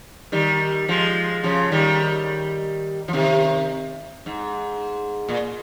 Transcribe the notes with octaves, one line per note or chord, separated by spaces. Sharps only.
D#3 G3
F3 G#3
C#3 F3
D#3 G3
F3
C3 D#3
G#2
A#2